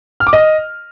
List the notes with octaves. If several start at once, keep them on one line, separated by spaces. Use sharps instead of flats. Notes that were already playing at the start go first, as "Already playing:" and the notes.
F6
D6
D#5